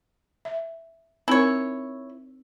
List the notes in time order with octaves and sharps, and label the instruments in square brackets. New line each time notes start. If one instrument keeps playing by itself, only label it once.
[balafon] E5
[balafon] C4 D#4 A#4 [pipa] E4 C#5